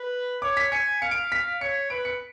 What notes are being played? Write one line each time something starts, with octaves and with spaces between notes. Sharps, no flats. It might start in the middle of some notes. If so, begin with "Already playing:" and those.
Already playing: B4
C#5 D6
B6
G#5 C#7
F5 C#7
D7
B6
C#5 C#7
B4 D7
C#7